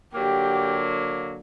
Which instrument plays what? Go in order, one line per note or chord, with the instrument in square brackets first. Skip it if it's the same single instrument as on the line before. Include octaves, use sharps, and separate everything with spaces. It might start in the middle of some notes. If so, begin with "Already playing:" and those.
[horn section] D3 F#3 A#3 [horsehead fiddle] G4